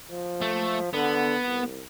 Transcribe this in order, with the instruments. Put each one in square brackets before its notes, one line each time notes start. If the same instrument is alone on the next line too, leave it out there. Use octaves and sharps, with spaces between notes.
[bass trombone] F3
[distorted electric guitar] A3
[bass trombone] D3 [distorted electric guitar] B3
[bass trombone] C2